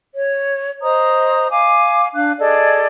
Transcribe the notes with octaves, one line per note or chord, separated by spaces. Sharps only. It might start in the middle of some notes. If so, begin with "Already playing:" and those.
C#5
C5 D#5 A#5 D#6
F5 G#5 D6
D4 F5 F#6
G#4 A4 D5 D#5